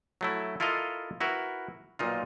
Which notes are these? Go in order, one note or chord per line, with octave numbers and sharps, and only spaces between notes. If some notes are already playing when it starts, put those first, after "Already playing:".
F#3 A3 E4
E4 F4 A4 A#4 D#5 F5
E4 F#4 A#4 B4
B1 A#2 D#4 F4